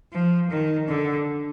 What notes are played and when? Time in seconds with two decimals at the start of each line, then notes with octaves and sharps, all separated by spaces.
0.12 F3
0.51 D#3
0.88 D3